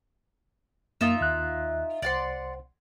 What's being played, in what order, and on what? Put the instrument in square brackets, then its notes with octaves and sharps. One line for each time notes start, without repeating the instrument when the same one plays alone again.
[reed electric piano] F#2 A#3 [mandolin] D#4 F4 E5
[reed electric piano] D#2 F#6
[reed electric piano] C2 C5 [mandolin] D5 F#5 C6